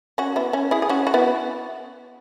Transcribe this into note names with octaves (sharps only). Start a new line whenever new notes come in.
C#4 F#4
B3 E4
C#4 F#4
E4 G#4
G#4
C#4 F#4
F#4
B3 E4